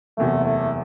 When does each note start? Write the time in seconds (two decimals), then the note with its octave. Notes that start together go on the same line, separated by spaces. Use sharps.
0.17 F#1 E2 C3 A3
0.45 A3